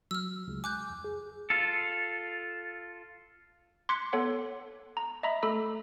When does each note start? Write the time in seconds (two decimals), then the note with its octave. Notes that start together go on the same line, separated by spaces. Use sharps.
0.11 F#3 E6 F6
0.47 C#2 G#3
0.64 G#5 D6 F#6 G6
0.90 F2
1.04 G#4
1.50 F4 A4
3.89 C6 D6 F#6 G#6 B6 C#7
4.13 B3 A4 C#5 F#5
4.97 A#5
5.23 D#5 E5 A#5 B5
5.43 A3 A4 B5 E6